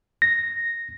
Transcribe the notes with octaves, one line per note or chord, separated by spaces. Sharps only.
A#6